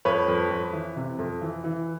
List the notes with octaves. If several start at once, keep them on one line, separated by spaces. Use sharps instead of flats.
F2 B4 C#5
F2
F2
E3
C3
F2
E3
E3